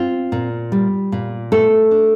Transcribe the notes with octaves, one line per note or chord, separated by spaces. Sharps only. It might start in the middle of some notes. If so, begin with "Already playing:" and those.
Already playing: C4 F4
A#2
G3
A#2
A3 A4
D4